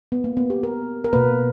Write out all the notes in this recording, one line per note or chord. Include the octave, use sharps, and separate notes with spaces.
B3
A#3
B3
G4
A#4
A#4
B2 A#3 B4